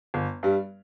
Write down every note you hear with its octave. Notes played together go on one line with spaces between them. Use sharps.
G1
G2 G3